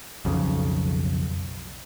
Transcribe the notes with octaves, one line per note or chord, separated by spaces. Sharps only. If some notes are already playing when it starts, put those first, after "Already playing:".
B1 F2 C#3